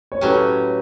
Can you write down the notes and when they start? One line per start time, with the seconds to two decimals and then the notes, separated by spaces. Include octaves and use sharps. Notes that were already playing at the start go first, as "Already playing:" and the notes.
0.12 C#5
0.21 A2 F#3 C#4 G4 B4